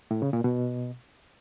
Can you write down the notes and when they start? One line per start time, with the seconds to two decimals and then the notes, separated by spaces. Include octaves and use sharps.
0.11 A2
0.22 C#3
0.33 A#2
0.44 B2